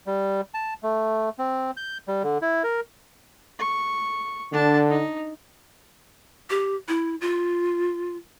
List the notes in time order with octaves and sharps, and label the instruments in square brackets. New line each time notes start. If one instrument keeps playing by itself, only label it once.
[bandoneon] G3
A5
A3
C4
G6
G3
D3
E4
A#4
[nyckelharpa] C#6
[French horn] D3 [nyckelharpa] D4 A5
[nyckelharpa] D#4
[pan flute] G4
E4
F4